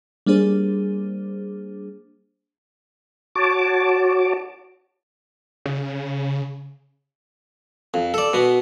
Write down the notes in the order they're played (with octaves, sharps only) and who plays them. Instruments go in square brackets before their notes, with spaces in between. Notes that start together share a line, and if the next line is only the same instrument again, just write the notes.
[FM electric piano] G3 A#3 D4 G#4 C5
[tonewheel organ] F#4 C#5 A5 D6
[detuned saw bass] C#3
[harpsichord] F2
A4 D5
B2 B3